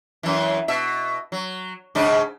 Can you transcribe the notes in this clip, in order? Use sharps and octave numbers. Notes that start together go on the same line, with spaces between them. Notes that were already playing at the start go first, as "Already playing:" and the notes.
F#2 E3
B2 E5
F#3
G#2 C#3 D4